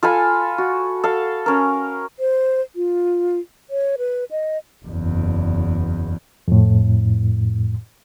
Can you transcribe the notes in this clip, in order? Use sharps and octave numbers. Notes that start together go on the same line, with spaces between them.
F4 A4 G#5 B5
F#4
A4 F5
C#4 A#4
C5
F4
C#5
B4
D#5
F#1 E2
F2 A2